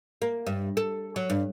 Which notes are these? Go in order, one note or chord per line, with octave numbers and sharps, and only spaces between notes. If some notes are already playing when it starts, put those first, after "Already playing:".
A#3
G2
A4
F#3
G2